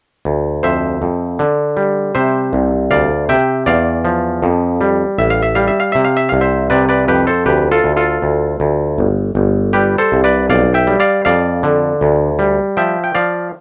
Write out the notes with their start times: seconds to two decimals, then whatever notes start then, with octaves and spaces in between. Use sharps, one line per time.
0.25 D2
0.63 F2 C5 E5
1.02 F2
1.39 D3
1.77 G3
2.15 C3 C5 E5
2.53 C2
2.91 D2 D5 F5
3.29 C3 E5 G5
3.66 E2 D5 F5
4.05 F3
4.43 F2
4.81 G3
5.18 A1 E5
5.30 F5
5.42 E5
5.55 G3 F5
5.67 E5
5.80 F5
5.92 C3 E5
6.04 F5
6.17 E5
6.29 C2 F5
6.41 C5 E5
6.70 C3 B4 D5
6.89 B4 D5
7.08 F2 G4 B4
7.27 A4 C5
7.46 D2 G4 B4
7.71 F4 A4
7.84 D2
7.97 F4 A4
8.22 D2
8.60 D2
8.98 G1
9.35 G1
9.73 G3 G4 B4
9.98 A4 C5
10.12 C2
10.24 B4 D5
10.49 B1 D5 F5
10.74 E5 G5
10.87 G3
11.00 D5 F5
11.25 F2 D5 F5
11.63 D3
12.01 D2
12.39 G3
12.77 F3 E5 G5
13.04 G5
13.15 F3 D5 F5